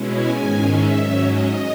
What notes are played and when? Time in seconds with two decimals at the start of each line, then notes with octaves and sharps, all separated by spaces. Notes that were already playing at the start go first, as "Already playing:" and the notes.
Already playing: B2 G#3 C#4 E4
0.10 G#5
0.39 G#2 D#3 G#3 C#4
0.68 E5
0.96 G#2 F#3 C#4
1.25 D#5